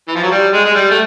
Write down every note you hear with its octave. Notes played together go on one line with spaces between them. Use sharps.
E3
F3
F#3
G3
G#3
G#3
G3
A3